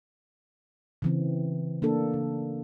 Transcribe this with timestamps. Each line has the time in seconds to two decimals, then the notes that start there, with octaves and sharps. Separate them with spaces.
1.02 C#3 E3 C4
1.82 A#3 D4 A4
2.14 C#3